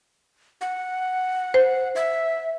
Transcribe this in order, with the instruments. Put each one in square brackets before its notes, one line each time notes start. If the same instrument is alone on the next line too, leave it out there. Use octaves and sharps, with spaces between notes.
[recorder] F#5
[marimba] C5
[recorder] E5